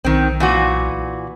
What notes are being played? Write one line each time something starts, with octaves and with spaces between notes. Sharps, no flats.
B1 D#3 C4
A#2 E3 F#4